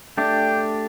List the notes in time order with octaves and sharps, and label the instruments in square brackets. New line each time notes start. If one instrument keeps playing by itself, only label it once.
[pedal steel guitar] A3 D4 G4 [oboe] G5